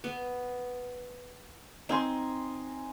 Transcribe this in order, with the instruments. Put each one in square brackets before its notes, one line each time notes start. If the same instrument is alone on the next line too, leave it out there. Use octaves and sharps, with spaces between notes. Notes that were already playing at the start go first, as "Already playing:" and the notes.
[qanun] B3
[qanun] C4 [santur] D#4 G#5 C6